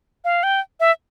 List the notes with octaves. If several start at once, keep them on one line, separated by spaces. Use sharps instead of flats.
F5
G5
E5